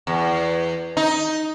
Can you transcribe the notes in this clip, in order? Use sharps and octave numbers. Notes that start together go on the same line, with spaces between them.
E2
D#4